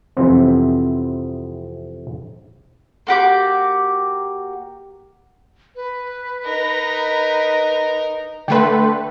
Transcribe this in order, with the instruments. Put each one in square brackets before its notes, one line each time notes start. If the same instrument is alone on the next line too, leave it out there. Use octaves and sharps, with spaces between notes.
[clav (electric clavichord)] F2 C3 E3 B3 C4
[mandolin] A#3 F#4 G4 D6
[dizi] B4
[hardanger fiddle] D#4 A#4
[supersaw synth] D3 A3 B4 [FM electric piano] G5 C6